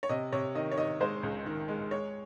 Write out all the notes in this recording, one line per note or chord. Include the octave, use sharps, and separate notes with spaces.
C#5
C3 D#5
C3 C#5
D#3 D#5
C#5
D#3 D#5
G#3 C5
C#2
D#3
G#3
G#3 C#5